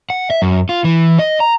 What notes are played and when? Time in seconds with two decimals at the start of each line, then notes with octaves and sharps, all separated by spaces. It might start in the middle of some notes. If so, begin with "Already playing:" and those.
0.10 F#5
0.30 E5
0.42 F#2
0.69 F4
0.84 E3
1.19 D#5
1.40 A#5